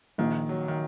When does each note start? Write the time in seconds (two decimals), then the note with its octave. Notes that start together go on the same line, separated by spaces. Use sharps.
0.18 A#1 D#3
0.49 F#3
0.68 D#3